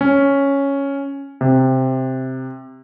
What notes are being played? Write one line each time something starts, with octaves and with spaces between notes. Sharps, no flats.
C#4
C3